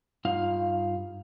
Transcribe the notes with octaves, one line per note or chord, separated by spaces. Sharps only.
G2 D#4 F4 F5